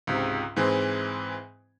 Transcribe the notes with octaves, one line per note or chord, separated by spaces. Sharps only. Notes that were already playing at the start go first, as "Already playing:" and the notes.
C#2 G#2 C3
G#2 E3 G#3 C4